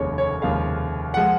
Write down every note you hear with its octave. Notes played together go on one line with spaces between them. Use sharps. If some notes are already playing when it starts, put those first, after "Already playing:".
Already playing: F1 D#2 C#3 F3 G#3 C#5
C#5
F1 D#2 C#3 F3 G#3 F5
F3 G#3 F#5